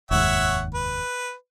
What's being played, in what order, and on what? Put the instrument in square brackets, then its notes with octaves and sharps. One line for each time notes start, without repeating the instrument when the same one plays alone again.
[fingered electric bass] F1 D#2 G#2 [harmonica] C#5 E5 F#5
[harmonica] B4